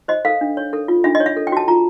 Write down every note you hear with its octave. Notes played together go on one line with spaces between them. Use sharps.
C5 D#5
A4 F5
D4
C#5
A4
F4
D4 E5
D#5
C#5
E5
A4
G5
F#4 A5
F4 A#5